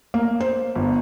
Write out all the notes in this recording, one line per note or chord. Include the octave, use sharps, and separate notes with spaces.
A#3
C5
G1